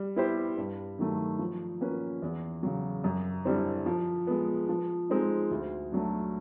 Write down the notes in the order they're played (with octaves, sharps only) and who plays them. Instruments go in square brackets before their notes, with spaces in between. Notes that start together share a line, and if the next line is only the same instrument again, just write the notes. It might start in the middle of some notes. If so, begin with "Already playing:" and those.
Already playing: [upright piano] G3
B3 E4 G4 C5
G2
D#3 F#3 A3
F3
A#3 C#4 F#4 B4
E2
C#3 F#3
F#2
D3 G3 C4 E4
F3
G#3 B3
F3
G#3 C4 D#4
D2
D3 F#3 A3